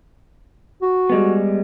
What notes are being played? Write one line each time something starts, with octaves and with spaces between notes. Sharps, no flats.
F#4
G3 G#3 B3